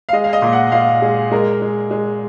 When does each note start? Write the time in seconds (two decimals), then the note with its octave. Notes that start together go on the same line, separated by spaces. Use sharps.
0.09 F5
0.13 G#3 D#5
0.24 F5
0.33 D#5
0.42 A#2
0.53 F#5
0.72 A#2 F5
1.02 G#3 G#4
1.31 G#3 A#4
1.62 G#3
1.91 G#3